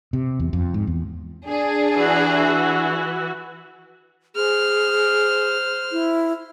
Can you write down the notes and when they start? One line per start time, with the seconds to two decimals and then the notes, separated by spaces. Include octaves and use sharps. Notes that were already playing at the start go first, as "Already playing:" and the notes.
0.13 C3
0.39 E2
0.53 F2
0.74 G#2
0.87 E2
1.47 D4 G#4
1.96 E3 F#4
4.36 G#4 C5 F6
5.92 E4